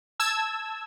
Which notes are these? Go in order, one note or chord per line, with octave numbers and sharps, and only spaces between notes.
A5 E6 G#6